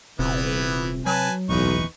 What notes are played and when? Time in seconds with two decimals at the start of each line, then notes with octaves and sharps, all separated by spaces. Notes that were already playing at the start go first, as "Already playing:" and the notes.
0.19 D#1 C3 E3 B3
1.06 F#3 B4 G#5 A5
1.50 D1 B1 E2 E3 D#4 B4 C#6